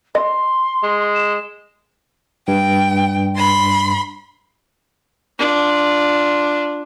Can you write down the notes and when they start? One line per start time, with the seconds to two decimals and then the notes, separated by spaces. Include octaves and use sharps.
0.15 D#5 C6
0.83 G#3
1.14 E7
2.48 G2 G5
3.37 B5 C6
5.39 D4 F4